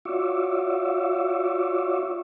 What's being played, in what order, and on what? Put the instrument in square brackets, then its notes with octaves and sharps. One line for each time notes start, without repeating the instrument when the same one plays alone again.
[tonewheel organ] F4 F#4 C#5 D5 E5